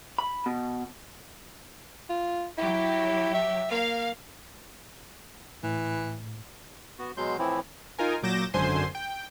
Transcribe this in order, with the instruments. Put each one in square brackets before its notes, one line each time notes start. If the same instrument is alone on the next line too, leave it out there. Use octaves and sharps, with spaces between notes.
[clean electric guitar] B5
B2
[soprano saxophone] F4
[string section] F#3 G4 [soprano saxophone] E4
[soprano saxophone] E5
[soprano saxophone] A#3 [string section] F5
[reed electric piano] A2 [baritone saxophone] E3
[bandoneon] B3 F#4
B2 F#3 G#3 C6 G6
A2 E3 F3 C4 E4
[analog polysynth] D#4 F4 A#4 G#5
A#2 F#3 D6 G6 A#6 E7
G#1 F#2 D3 C5 G#5 C6
G5